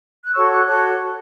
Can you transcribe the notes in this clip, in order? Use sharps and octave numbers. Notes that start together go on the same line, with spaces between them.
F#6
F#4 A4 C#5 C#6 E6
D6 F#6
F#4 A4 C#5 D6 F#6